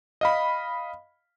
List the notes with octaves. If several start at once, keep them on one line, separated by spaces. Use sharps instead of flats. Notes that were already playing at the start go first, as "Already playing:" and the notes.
D#5 F5 B5